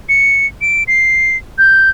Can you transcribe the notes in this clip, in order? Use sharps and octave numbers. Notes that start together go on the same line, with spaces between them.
C#7
D7
C7
G6